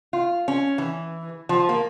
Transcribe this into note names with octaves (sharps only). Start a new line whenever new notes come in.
F4
C#4
E3
F3
A#3